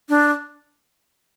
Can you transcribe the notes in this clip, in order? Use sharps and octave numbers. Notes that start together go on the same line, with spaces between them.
D4